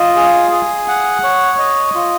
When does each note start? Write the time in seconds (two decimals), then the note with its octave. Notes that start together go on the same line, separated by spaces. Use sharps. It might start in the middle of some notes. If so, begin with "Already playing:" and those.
Already playing: F4 D#5
0.16 G#4
0.51 G#4
0.88 F#5
1.23 C#5
1.59 D#5
1.95 F4